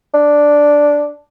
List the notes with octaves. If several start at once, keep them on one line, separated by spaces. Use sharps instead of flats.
D4